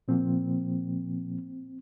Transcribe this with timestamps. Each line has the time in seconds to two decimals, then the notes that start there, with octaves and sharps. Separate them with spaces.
0.08 A#2 F3 A#3 C4